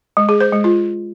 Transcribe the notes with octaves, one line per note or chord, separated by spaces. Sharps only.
G#3
G#4
C5
G#3
F4